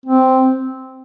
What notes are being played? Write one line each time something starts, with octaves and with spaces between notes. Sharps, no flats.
C4